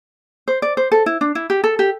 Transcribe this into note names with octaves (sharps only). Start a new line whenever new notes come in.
C5
D5
C5
A4
E4
D4
E4
G4
A4
G4